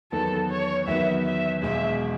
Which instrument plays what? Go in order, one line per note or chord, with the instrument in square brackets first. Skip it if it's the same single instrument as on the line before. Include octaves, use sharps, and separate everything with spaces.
[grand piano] E2 D#3 F#3 B3 F#4 [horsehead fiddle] A4
[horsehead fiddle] C#5
[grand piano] E2 D#3 F#3 B3 F#4 [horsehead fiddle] E5
[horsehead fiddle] E5
[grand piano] E1 E2 B2 G#3 [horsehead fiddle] E5